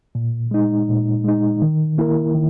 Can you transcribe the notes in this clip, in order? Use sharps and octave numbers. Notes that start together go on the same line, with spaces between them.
A#2
G#3 D#4
A#2
G#3 D#4
D#3
A#3 E4 A#4
D#3